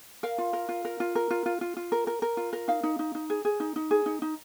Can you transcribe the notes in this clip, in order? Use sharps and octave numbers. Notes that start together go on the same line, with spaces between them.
A#4 F5
F4
A#4
F4
A#4
F4
A#4
F4
F4
F4
F4
A#4
A#4
A#4
F4
A#4
D#4 F5
D#4
D#4
D#4
G#4
G#4
D#4
D#4
G#4
D#4
D#4